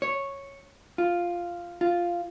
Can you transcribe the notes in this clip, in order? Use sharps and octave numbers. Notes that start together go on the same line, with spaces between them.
C#5
F4
F4